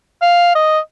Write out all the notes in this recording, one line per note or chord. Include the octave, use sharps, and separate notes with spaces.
F5
D#5